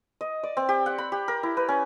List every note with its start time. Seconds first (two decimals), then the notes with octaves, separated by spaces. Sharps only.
0.21 D#5
0.43 D5
0.57 C4
0.69 G4
0.86 F#5
0.98 B5
1.12 G4
1.28 A#4
1.43 E4
1.57 B4
1.68 C#4